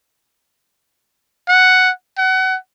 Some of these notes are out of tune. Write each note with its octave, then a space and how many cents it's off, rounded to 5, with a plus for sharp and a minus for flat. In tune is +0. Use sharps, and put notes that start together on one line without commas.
F#5 +5
F#5 +25